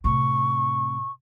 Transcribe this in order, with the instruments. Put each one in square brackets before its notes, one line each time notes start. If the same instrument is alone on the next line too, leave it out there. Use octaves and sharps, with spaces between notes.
[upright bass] A2 C3 [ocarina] C#6